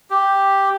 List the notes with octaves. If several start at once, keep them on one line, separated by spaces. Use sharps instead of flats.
G4